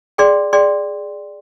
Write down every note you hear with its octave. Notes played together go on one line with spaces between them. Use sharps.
G#4 D5 G5 C6
G#4 D5 G5 C6